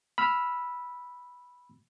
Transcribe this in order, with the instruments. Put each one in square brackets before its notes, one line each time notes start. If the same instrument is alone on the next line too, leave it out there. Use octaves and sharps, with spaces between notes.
[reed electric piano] B5 E6 F6